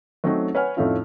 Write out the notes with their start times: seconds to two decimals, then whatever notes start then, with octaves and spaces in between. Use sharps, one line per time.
0.24 F#3 A3 C4 C#4 D#4 F#4
0.55 B4 C#5 F#5 G#5 F6
0.77 F2 A2 A3 C#4 D#4 F4